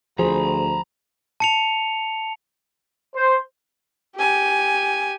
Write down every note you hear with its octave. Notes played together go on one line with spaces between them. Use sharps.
D2 F3 G#4 C5 A#5 B5
A5 C#7 F7
C5
G4 G#5